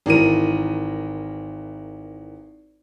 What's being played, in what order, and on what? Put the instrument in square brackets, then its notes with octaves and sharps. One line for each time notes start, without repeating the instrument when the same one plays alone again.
[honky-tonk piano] G#1 E3 A#4 D#7